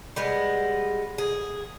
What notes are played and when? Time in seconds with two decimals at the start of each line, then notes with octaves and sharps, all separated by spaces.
0.16 G3 G#3 B3
1.18 G#4